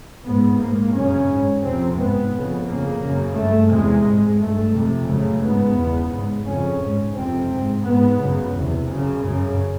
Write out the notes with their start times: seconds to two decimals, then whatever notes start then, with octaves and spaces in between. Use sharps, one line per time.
0.25 G#2 B3
0.59 G#2 A#3
0.94 F#2 C#3 C#4
1.28 G#2
1.64 F2 C3 C4
1.97 G#2 B3
2.33 F2 C#3
2.66 F2 C#3 A#3
3.01 F#2 C#3
3.35 G2 A3
3.69 E2 C3 G#3
4.04 G#2
4.39 G2 A3
4.73 F2 C3
5.07 F#2 C#3 A3
5.42 G#2 B3
5.76 E2 C#3
6.11 G#2
6.45 F2 C#3 C#4
6.79 G#2
7.14 F2 C3 C4
7.49 G#2
7.83 G#2 B3
8.17 F#2 C#3
8.52 E2 C3
8.86 F#2 C#3
9.20 F#2 C#3